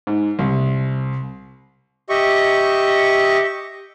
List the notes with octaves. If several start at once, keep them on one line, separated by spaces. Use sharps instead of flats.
G#2
C2
G4 D#5 E5 C#6